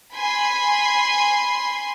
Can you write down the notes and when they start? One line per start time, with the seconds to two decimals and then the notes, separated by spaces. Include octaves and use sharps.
0.16 G#5 B5 C6